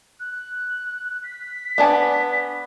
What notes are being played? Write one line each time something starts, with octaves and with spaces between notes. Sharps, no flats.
F#6
B6
B3 D4 G#5